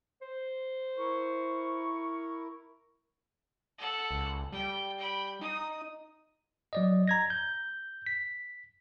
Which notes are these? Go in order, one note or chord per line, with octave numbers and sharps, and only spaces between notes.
C5
E4 A#4 C#6
A4 F#5
C#2
G3 G5
G5 B5
D#4 D#6
F#3 D5 D#5
A#5 G#6 A#6
G6
B6